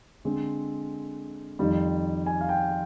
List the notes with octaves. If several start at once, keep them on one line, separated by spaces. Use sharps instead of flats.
D3 G#3 C4
F2 D#3 G3
G#5
F5
G5